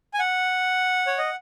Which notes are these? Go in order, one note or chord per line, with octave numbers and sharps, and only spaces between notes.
G#5
F#5
C#5
D#5